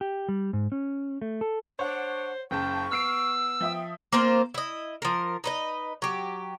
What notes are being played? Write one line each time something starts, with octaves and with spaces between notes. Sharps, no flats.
G4
G3
G#2
C#4
A3
A4
D4 C5 C#5 F#5
F#1 C#3 G5 A5 C#6
B3 E6 F6 C7 D7
F3 E5 G5 D#6
A#3 C4 F4 C5
E4 D#5
F3 A#4
D#4 B4 D#5
F#3 G4